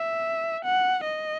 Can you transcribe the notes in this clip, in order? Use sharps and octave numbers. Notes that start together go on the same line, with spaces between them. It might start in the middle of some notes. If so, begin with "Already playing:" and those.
Already playing: E5
F#5
D#5